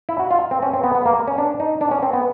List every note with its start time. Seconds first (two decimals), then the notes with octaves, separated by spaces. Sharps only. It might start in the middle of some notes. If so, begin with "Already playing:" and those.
0.09 E4
0.19 F#4
0.31 F4
0.51 C4
0.62 C#4
0.73 C4
0.84 B3
0.95 B3
1.06 A#3
1.28 C#4
1.38 D4
1.60 D#4
1.81 D4
1.91 C#4
2.03 C4
2.13 B3